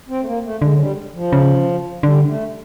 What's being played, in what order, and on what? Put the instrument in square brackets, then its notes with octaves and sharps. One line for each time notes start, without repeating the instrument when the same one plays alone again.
[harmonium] C4
A3
A#3
A3
[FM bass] D3 [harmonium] G#3
[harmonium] F#3
G3
F3
[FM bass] C#3
[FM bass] D3 [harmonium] G3
[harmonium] A3